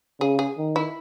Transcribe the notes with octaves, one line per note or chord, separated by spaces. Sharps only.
C#3 G#4
G#4
D#3
E4